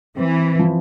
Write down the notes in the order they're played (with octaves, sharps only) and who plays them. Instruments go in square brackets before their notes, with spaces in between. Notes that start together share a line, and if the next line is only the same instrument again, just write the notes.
[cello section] E3 [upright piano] C4
[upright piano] F3